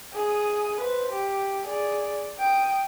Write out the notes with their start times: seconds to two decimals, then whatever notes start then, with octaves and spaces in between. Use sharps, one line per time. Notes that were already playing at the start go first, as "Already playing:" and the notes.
0.13 G#4 D#6
0.81 B4 C5
1.13 G4
1.66 G#4 D5
2.38 G5 D#6